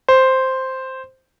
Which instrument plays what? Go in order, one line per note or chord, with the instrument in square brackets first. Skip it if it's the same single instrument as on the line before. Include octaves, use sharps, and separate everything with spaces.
[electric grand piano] C5